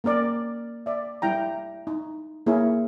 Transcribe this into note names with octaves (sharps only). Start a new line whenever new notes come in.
A#3 C#4 A#4 D5
D5 E5
G3 E4 G5 A#5
D#4
A#3 E4 G#4 A#4 C#5 E5